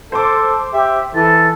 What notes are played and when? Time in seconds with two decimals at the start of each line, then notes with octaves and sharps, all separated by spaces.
0.12 A4 C5 C6 D6
0.73 G4 E5
1.15 E3 A4 A6